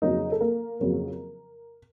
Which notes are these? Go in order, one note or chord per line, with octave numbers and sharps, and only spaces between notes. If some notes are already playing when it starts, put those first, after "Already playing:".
F2 C#3 F#3 A#3 D#4
A4
A#3 A#4
F2 C#3 F#3 A#3